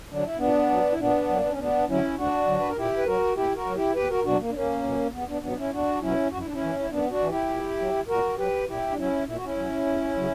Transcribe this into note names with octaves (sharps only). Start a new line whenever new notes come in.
D3 F#3 D4
E4
A#2 B3 D4
F#3
E4
A#2 B3 D4
F#3 A#3
B3
C#4
D2 B3 D4
D3 F#3 C#4 E4
D2 D4 F#4
D3 F#3
B4
A#4
A#2 E4 G4
B4
F#3 F#4 A#4
A#2 E4 G4
F#4 A#4
F#3
E4 G4
E2 G4 B4
F#4 A#4
B2 F#3 D4 F#4
A#3
D4
E2 A#3 C#4
B2 F#3
E2 B3
B3 D4
B2 F#3 B3 D4
D4
C#4 E4
E2 D4 F#4
B2 F#3 C#4 E4
F#2 F#4
E4
D4
C#4 E4
E3
E4
F#2 B3 D4
D4 F#4
E3
E4 G4
A#2
F#3
A#2 F#4 A#4
F#3 G4 B4
A#2 E4 G4
D4
F#3 C#4 E4
A#2 E4
F#4
C#4 E4
F#3
E2
C#3 F#3